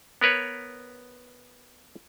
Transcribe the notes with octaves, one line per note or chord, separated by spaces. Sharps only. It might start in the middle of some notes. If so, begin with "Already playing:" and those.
B3 A#4 B4 C#5